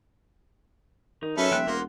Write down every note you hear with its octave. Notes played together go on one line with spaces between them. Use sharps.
D#3 D#4
F#2 C#4 A4 B4 E5
D#1 F3 G5 F#6
E1 A#3 F4 F#5 C6